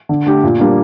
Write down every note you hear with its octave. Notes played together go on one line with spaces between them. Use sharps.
D3
A3 D4 G4
A#2
G3 A#3 D4